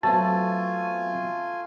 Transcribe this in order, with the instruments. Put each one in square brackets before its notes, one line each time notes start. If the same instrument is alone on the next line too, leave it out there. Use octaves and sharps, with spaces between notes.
[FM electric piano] F#3 B3 C4 [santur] A3 [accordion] F4 G#5 [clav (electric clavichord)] A5